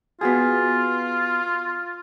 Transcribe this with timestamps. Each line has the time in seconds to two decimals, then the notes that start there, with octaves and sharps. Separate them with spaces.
0.21 B3 F4 F#4 G#4